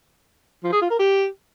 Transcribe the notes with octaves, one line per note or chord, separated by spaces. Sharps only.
F3
G#4
F4
A#4
G4